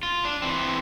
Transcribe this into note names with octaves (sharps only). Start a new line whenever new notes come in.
F4
D4
E3 C4